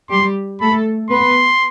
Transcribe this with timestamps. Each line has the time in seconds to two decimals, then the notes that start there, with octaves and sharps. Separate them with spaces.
0.10 G3 G4 C6
0.60 A3 A4 B5
1.10 B3 B4 C6